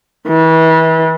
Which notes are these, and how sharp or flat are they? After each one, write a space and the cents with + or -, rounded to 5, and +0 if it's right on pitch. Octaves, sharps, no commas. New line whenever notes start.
E3 -30